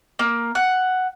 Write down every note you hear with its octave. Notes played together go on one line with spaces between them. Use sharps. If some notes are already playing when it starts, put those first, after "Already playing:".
A#3
F#5